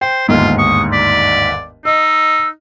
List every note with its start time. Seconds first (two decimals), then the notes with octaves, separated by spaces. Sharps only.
0.01 C5 G5
0.28 G1 D#2 G#2 F4
0.58 C#6 D#6
0.92 D5 B6
1.85 D#4 D#5 E6